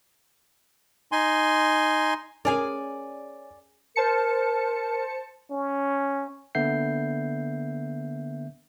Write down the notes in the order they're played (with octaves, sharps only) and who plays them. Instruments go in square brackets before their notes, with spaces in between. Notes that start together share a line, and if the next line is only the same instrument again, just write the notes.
[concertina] D#4 G#5 C6
[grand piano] C#4 [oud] G#4 A#4 [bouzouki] D5 G#5
[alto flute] A#4 [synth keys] C5 A5 C#7
[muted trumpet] C#4
[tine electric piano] D3 A#3 B3 E5 G6 C7